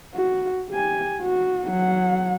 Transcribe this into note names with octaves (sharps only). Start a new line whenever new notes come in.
F#4
G4 G#5
F#4
F#3 F#5